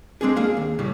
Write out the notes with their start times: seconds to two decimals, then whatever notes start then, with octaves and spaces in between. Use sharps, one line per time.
0.21 G#3 C4 D4 G#4
0.36 A#3 G#4 F5
0.57 D#2
0.79 A2 C#3 G3